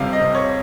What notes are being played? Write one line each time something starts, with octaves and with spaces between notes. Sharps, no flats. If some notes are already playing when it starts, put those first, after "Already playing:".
Already playing: F2 C3 G3 F5
D#5
C3
C#5